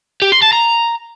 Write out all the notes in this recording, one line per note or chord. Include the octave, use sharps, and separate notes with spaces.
G4
C6
A5
A#5